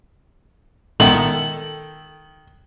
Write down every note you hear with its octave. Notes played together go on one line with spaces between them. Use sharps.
A#2 D#3 G#3 B3 A4 E5 G5 F#7